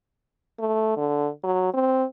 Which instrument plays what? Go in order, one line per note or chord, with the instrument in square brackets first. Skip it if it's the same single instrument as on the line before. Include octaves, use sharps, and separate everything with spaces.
[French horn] A3
D3
F#3
C4